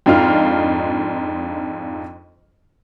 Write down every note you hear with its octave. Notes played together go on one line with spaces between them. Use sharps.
F2 G#2 D4 D#4 F4 F6